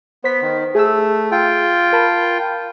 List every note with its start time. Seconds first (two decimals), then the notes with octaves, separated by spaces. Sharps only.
0.24 B3 C5 B6
0.42 D#3
0.75 A3 G#4 E6
1.32 F4 G5
1.93 A#4 A5 B5